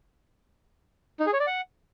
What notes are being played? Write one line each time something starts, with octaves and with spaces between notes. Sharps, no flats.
D#4
G#4
C#5
D5
F#5